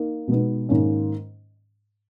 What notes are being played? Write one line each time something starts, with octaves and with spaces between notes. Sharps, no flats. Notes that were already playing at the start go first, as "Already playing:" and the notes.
Already playing: A#3 D#4
B2 G#3 B3 D#4
G#2 D#3 A#3 C#4